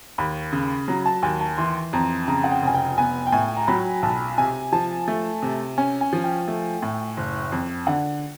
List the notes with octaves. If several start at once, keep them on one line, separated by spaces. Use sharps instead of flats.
D#2 B5
C#3
F#3 A#5
A5
D#2 G#5
A5
E3 C6
F2 A#5
C#3 A#5
F#5
G5
F1 G#5
G5
B3 G#5
G5
A2 G#5
A#5
F#3 B5
B1 A5
C3 G#5
F3 A5
A3
C3
C#4 G#5
G#5
F3
G5
A3
A2
F#1
F2
D3 F#5